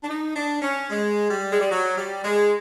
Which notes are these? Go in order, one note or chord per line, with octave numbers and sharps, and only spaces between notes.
D4
D#4
D4
C#4
G#3
G3
G#3
G3
F#3
G3
G#3